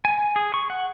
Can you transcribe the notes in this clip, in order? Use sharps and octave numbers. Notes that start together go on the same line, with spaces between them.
G#5
G#4
C#6
F#5